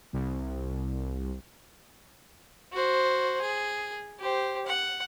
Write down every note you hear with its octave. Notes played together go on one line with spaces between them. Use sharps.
C2
F#4 C5
G#4
G4 C5
F#5